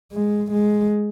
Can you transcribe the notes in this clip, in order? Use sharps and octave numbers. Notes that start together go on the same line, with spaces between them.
G#3
G#3